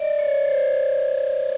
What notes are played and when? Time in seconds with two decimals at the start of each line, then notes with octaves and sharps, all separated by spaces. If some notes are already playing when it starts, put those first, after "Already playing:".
Already playing: D5 D#5
0.19 C#5
0.45 C5